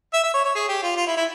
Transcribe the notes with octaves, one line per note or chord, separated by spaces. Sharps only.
E5
E5
C#5
C#5
G#4
G4
F4
F4
E4
E4